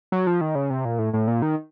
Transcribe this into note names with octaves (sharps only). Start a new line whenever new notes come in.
F#3
F3
D#3
C#3
C3
A#2
A2
A2
A#2
D#3